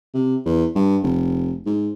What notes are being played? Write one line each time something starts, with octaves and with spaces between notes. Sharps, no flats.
C3
E2
G2
F1
G#2